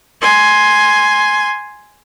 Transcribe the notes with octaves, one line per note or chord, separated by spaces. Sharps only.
G#5 C6